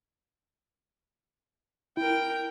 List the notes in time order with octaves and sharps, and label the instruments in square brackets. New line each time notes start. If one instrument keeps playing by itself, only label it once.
[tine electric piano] E4 [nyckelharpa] A#4 G5